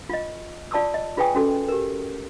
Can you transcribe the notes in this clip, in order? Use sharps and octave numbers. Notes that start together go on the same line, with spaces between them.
F4 D#5
F4 D5 A5 C#6 D#6 E6
D#5
F4 G#4 B4 G5 G#5 D#6
C#4 F#4 A4
G4 A#4